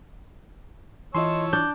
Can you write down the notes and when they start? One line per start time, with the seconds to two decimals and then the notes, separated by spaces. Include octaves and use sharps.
1.15 E3 E4 F4 C#5 D#5 A5 C6 E6
1.53 D4 G6